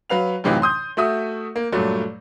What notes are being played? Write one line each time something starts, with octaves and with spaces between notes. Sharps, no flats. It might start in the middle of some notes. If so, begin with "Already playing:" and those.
F#3 B4 F5 F7
F#2 A2 C3 E3 D#4 F4
C6 D#6 G6
A3 F#4 E5 D#6
A#3
G2 A#2 F#3 A3